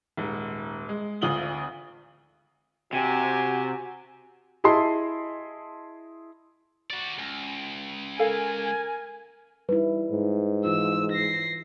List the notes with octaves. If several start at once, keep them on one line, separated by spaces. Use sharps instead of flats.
D#1 G#2
G#3
G#1 D2 F4 D#6 F#7 G7
C3 F#4 G4 G#5
E4 G#4 D#5 A5 C6
F#4 D5
C#2
A4 A#4 F5 G#5
G3 D#4 E4 B4
G#2
E3 E4 F4 E6
A#6 C7